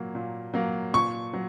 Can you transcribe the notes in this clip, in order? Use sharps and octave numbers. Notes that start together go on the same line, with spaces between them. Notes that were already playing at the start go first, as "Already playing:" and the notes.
Already playing: A#2 F#3 A#3
A#2
F#3 A#3
A#2 C#6
F#3